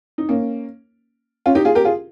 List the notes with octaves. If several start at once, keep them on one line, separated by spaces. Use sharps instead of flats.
D#4
A#3 C#4
C#4 F4
D#4 G4
F4 G#4
G4 A#4
F4 G#4